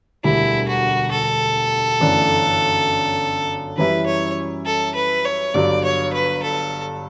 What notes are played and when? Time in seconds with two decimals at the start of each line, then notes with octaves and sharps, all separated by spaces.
0.24 E1 D2 D3 G3 E4
0.68 F#4
1.12 A4
2.00 G1 F#2 E3 A3 D4
3.77 F#2 E3 G3 C#4 E4 B4
4.07 C#5
4.66 A4
4.95 B4
5.25 C#5
5.54 G1 G2 F#3 D5
5.84 C#5
6.13 B4
6.43 A4